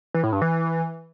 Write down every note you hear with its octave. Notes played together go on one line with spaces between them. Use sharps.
E3
A2
G2
E3